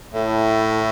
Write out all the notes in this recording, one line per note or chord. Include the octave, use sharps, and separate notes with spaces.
A2